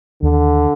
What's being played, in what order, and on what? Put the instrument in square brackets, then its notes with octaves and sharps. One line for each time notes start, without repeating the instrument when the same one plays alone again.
[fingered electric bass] D#2 [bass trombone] D3